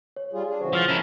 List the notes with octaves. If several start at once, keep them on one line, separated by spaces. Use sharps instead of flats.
C#5
G3 F4 G#4
D4 G#4
C#3 E3 F#4 C5 E5
F3 E6 F6 A6
A#3 C#4 E4 A#4